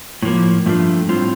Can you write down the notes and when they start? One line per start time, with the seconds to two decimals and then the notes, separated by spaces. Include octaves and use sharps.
0.22 A2 F3 A#3
0.66 G2 F3 A3 D4 F4
1.09 A2 G3 C4 F4